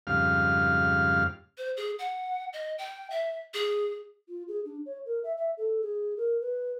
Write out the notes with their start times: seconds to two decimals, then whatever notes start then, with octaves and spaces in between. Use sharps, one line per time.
0.07 F2 G#2 C#3 G3 F5 F6
1.58 C5
1.77 G#4
1.99 F#5
2.53 D#5
2.78 G5
3.10 E5
3.54 G#4
4.28 F4
4.48 G#4
4.65 D4
4.85 C#5
5.05 A#4
5.23 E5
5.37 E5
5.57 A4
5.81 G#4
6.16 A#4
6.40 B4